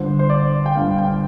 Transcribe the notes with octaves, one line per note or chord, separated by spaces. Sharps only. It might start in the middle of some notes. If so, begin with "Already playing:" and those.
Already playing: G1 G2 D3 C5
C5
D5
G5
G1 G2 D3 F5
G5